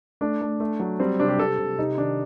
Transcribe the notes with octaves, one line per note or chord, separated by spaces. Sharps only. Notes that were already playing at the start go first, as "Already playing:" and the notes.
A3 D4
A3
A3
F#3
G3 C4
C3 D4
G4
C3 A4
C3
C3 D#4
D#3 D4